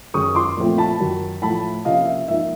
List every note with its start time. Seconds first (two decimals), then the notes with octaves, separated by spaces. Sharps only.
0.14 F#2 D#3 G#3 C#4 C#6 D#6
0.35 C6 D6
0.57 A#2 F3 A3 C4
0.78 A5 B5
1.00 F#2 D#3 F#3
1.42 A2 F3 A3 A5 B5
1.85 C3 F3 A#3 C#4 D#5 F5
2.06 E5
2.28 G#2 F3 A#3 D#4 E5